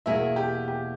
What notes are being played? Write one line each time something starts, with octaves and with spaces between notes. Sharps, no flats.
E2 B2 A#3 E4 G#4 E5
G4
G4